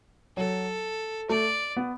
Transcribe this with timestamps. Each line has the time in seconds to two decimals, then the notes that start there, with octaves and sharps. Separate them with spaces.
0.37 F#3 A4
1.29 A3 D5
1.77 B3